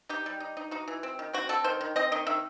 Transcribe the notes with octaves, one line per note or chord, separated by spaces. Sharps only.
D#4 G4
G3
D#4
D#4
D#4 F#4
E3
C4
D#3
C4 F#4
C4 A4
D#3 C5
D#3
C4 D#5
D#3 D#5
D#3 E5